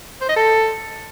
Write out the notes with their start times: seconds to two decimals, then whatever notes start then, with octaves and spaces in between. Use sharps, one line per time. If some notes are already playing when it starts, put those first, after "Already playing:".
0.21 C5
0.29 D#5
0.37 A4